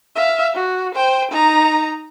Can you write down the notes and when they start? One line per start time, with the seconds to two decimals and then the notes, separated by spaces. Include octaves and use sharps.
0.15 E5 F5
0.54 F#4
0.95 C5 G5
1.31 D#4 A#5